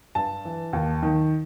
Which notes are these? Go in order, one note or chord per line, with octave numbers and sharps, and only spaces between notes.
G2 A5
E3
D#2
D#3